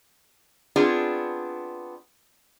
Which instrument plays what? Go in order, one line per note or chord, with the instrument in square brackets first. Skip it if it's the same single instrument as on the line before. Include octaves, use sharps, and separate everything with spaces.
[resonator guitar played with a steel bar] B3 C4 D4 F4 G#4